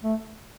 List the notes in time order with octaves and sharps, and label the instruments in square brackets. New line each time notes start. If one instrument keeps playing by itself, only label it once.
[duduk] A3